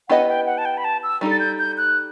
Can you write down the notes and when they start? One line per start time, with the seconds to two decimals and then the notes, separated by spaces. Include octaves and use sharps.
0.08 B3 E4 G4 B4 D#5 F#5
0.28 G5
0.46 F#5
0.58 A5
0.65 G5
0.77 B5
0.84 A5
1.03 E6
1.21 G3 D#4 A4
1.31 A6
1.40 G6
1.59 G6
1.78 F#6